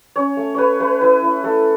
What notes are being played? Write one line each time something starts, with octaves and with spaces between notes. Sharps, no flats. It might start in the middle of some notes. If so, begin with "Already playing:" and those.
C#4 C#5
A3
A3 B4 C#5
A3 B4
E4 B4
E4
A3 A4